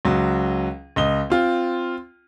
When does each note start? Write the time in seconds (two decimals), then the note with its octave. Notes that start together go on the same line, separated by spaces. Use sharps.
0.05 C#2 F#3
0.96 C#2 D#5 G7
1.30 C4 F4 G5